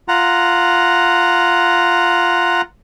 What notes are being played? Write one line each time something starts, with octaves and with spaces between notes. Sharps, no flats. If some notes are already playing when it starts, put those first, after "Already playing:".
F4 F#5 A#5